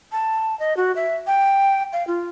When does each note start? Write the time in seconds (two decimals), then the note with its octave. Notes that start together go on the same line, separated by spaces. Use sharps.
0.12 A5
0.59 D#5
0.77 F#4
0.96 E5
1.27 G5
1.93 F5
2.07 F4